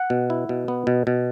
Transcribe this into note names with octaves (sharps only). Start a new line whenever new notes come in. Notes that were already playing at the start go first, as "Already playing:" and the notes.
Already playing: F#5
B2
E4
B2
B3
B2
B2